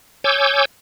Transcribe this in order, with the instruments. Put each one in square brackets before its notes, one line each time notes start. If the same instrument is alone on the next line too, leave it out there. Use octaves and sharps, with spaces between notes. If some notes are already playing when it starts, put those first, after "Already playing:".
[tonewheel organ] C#5 G#5 D6 E6 G6